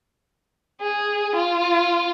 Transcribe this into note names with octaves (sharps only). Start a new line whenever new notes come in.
G#4
F4